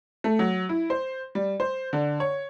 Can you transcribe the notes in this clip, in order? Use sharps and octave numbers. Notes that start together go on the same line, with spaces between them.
A3
F#3
E4
C5
G3
C5
D3
C#5